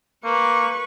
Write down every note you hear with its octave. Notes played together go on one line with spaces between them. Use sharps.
A#3 B4 C#6